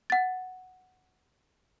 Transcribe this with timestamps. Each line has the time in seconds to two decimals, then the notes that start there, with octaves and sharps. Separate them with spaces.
0.10 F#5 A6